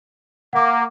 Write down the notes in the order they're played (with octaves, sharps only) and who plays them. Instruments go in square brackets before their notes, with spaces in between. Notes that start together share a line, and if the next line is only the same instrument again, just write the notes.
[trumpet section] A#3 [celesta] F#5 D6